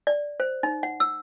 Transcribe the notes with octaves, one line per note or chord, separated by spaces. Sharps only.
D5
C5
D#4
F#5
E6